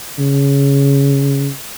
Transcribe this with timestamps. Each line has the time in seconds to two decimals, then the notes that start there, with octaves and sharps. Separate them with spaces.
0.19 C#3